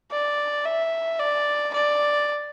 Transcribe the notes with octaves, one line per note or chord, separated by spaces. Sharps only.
D5
E5
D5
D5